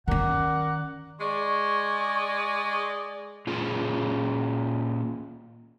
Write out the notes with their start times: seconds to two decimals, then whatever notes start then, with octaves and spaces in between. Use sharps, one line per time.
0.08 D#3 C#4 A#4 D5 F#5
1.20 G#3 D5 C#6
3.47 A#2 C#4 F4 G#4